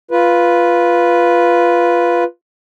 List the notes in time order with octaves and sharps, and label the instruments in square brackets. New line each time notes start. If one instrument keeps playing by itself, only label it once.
[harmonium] F4 B4